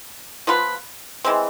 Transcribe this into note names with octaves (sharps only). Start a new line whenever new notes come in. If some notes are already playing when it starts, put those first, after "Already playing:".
F3 B3 F4 B4
E3 G#3 C4